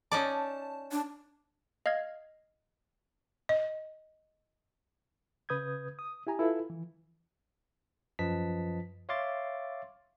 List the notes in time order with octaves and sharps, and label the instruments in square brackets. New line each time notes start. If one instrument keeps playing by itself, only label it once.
[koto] C#4 D#4 D5 [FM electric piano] A5
[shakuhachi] D4
[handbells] D#5 F5 F6 G#6
[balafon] D#5
[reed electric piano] C#3 B4 D#6 G6 G#6
D#6
E4 G4 G#5 A#5
E4 F4 A4 B4
E3
[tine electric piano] F#2 F3 B4 D#5 A5 B6
C#5 E5 F5 C6 D6 A6